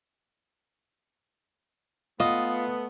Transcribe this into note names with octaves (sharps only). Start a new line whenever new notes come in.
A3 B3 F4 D#5